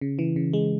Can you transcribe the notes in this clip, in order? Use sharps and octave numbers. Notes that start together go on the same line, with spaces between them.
C#3
E3
C#3
G#3